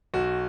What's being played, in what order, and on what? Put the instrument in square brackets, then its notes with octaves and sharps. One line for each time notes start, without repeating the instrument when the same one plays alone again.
[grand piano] B1 F#4